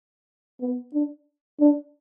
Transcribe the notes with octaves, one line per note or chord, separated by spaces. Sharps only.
B3
D4
D4